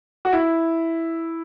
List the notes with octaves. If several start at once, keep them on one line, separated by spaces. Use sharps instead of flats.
F#4
E4